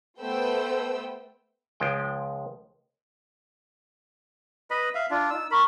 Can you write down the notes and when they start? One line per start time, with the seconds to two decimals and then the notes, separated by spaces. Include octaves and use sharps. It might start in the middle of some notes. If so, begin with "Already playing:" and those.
0.19 A3 B3 B4 C5 G5 E6
1.80 C#2 F3 G#3 G5
4.71 B4 D#5 B5
4.95 E5 F5
5.11 D4 F4
5.30 D#4 E6
5.51 A#4 B5 C#6